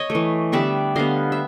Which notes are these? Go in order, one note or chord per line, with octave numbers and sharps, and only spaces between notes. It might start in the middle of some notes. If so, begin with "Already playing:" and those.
Already playing: C#5 D#5
A3
E3
D3 G3 B3 D5 E5
D3 G3 B3 D#5 F5
E5